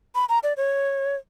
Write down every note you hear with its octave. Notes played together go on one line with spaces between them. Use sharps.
B5
A#5
D5
C#5